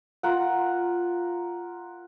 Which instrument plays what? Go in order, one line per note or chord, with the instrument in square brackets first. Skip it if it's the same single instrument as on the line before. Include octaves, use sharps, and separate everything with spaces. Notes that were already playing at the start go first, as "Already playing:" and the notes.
[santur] F4 A#4 F#5